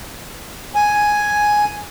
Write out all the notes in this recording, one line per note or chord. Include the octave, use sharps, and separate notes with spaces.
G#5